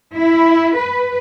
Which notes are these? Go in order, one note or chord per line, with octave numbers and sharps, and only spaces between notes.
E4
B4